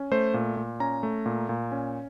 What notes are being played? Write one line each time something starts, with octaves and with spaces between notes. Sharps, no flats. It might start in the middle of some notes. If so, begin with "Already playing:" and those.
Already playing: C#4
A3 C5
A#2
A#2
C#4 A#5
A3
A#2
A#2
C#4